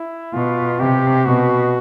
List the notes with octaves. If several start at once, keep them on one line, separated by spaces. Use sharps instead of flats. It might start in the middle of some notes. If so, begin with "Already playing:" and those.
Already playing: E4
B2 F4
C3 G4
B2 F#4